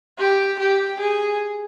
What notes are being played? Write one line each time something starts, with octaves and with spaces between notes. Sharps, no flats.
G4
G4
G#4